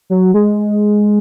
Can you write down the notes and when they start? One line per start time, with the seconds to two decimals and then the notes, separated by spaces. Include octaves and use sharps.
0.10 F#3
0.34 G#3